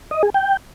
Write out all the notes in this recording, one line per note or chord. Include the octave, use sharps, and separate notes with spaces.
D#5
G#4
G5